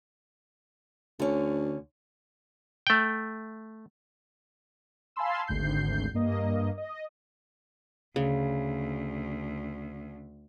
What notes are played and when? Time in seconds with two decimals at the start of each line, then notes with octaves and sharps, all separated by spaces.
1.20 D2 D3 C#4
2.87 A3 G5
5.16 F5 G#5 A5 B5 C6 E6
5.47 G#1 D2 G#2 G6 C7
6.14 G2 A#3 D#5
6.78 D#5
8.16 D2 C#3